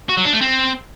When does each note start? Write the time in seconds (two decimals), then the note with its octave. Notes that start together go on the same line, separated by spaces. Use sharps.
0.09 F#4
0.17 F#3
0.25 D4
0.33 A3
0.41 C4